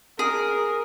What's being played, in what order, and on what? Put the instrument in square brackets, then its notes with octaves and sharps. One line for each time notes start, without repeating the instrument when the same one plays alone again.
[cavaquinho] G#4 [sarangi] A#4